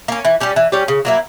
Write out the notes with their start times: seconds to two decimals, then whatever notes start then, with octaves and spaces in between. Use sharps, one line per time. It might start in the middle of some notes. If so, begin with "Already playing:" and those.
0.08 A#3 C#4
0.25 E3
0.40 G3 C#4 G4
0.56 E3
0.72 G3 C#4 G4
0.88 C#3
1.05 F#3 A#3 E4